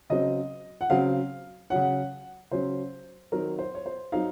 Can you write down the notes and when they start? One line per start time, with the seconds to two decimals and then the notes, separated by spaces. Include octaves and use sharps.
0.10 C#3 F#3 C4 D#5
0.81 F#5
0.90 C#3 F#3 C4 F5
1.70 C#3 F#3 C#4 F#5
2.51 C#3 F#3 C#4 C5
3.32 D#3 F#3 C4 D#4 A#4
3.59 C5
3.75 C#5
3.86 C5
4.12 F#3 C4 D#4 F5